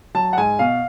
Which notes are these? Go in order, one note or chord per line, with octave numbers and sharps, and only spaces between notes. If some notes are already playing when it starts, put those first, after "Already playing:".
F#3 A5
F#5
G#2 G#5
B2 F5